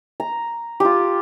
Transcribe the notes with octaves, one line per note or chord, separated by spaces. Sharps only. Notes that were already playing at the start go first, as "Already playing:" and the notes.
A#5
F4 G4